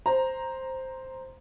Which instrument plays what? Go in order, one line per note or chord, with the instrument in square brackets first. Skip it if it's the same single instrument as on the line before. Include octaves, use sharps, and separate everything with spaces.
[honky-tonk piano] C5 A#5